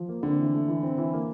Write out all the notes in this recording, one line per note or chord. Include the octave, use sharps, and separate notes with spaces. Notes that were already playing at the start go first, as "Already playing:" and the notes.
Already playing: F3
A#3
D3 C4
E3
A3
E3
C4
E3
A#3